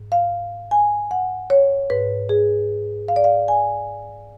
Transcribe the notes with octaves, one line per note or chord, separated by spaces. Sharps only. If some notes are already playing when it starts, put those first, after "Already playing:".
Already playing: G#2
F5
G#5
F#5
C#5
G#2 B4
G#4
F5
D5
F5
G#5